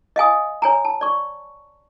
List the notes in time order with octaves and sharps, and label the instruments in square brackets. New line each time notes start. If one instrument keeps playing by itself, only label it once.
[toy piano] D#5 F5 G#5 D#6
C#5 G#5 A#5
A5
D5 C#6